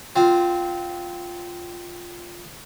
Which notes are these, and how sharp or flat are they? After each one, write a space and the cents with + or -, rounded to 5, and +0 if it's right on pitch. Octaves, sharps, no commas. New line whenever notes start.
C4 -15 F4 +0